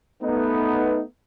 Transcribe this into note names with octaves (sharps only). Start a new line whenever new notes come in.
A3 B3 D#4